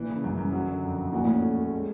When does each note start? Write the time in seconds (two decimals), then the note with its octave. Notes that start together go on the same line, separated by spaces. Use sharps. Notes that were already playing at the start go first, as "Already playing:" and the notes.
Already playing: A#2 E3
0.09 C#3
0.24 F#2
0.37 F#2
0.52 F#3
0.68 D3
0.83 F2
0.98 F2
1.12 A#2 F#4
1.24 A2 C#4
1.36 A#2
1.42 A3
1.57 A3
1.71 G#3